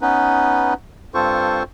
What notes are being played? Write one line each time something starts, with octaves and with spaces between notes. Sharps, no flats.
B3 C#4 D#4 B4
G2 C4 F4 A4 C5 C#6